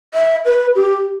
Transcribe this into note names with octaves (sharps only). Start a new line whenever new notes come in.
E5
B4
G4